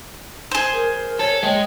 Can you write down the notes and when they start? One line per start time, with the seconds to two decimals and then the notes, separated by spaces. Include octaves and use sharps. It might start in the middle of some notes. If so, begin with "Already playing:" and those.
0.51 G#4 C5
0.73 A#4
1.19 A4 C#5
1.43 G#3 G5